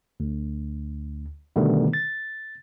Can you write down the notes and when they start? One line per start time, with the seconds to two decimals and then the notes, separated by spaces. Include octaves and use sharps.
0.20 D2
1.56 B2 D3 D#3 G3 A3 B3
1.93 A6